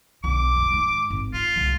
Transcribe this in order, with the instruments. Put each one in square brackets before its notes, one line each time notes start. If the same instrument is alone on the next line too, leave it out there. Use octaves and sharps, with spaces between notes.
[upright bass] B1 D3 [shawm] D6
[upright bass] F2
G#2 D#3
G#1
[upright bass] G#2 [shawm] F4
[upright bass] C2 G#2